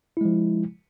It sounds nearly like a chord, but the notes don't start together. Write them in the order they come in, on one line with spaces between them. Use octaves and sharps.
E4 G#3 F3